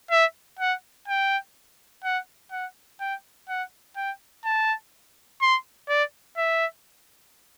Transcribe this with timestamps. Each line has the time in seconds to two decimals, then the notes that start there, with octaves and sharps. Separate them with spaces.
0.11 E5
0.59 F#5
1.08 G5
2.04 F#5
2.51 F#5
3.00 G5
3.49 F#5
3.96 G5
4.44 A5
5.41 C6
5.89 D5
6.37 E5